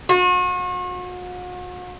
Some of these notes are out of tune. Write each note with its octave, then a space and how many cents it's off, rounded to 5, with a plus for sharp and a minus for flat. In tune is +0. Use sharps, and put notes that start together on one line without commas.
F#4 -40